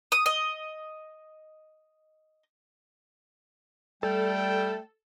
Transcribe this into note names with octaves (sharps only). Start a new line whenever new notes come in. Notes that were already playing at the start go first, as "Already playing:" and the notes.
D#6
D#5
G3 A3 A4 G5